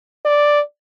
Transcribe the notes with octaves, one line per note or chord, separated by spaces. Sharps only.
D5